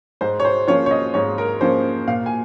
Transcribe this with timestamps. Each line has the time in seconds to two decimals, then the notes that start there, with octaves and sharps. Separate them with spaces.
0.21 G#2 C5
0.40 C#5
0.45 C5
0.68 F3 A#3 C#4 F4 C#5
0.86 C#5
0.91 D#5
1.14 G#2 C#5
1.38 A#4
1.60 F3 A#3 C#4 F4 C5
2.08 A#2 F5
2.26 G#5